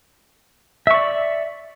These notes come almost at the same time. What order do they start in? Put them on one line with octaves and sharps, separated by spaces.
E5 C#6 D5